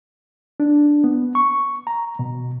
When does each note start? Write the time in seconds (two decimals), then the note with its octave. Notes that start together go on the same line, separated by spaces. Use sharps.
0.60 D4
1.04 B3
1.35 C#6
1.87 A#5
2.19 B2